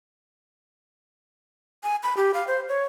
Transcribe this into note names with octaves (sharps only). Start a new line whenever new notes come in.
G#5
B5
G4
F5
C5
C#5